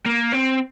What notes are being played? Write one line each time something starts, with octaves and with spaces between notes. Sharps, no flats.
A#3
C4